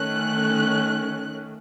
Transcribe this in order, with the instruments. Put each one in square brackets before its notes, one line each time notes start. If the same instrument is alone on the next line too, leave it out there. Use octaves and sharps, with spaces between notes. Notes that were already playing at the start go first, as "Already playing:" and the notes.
Already playing: [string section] D#3 A3 C#4 F#6